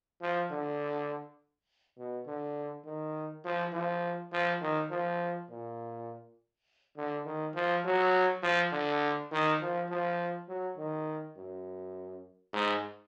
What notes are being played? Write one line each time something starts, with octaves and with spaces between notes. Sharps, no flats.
F3
D3
B2
D3
D#3
F3
F3
F3
D#3
F3
A#2
D3
D#3
F3
F#3
F3
D3
D#3
F3
F3
F#3
D#3
F#2
G#2